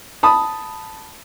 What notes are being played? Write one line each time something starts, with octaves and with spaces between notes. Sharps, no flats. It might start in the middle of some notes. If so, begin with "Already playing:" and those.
A5 B5 D#6